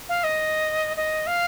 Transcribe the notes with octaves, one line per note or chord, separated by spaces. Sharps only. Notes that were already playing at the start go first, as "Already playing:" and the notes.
F5
D#5
D#5
F5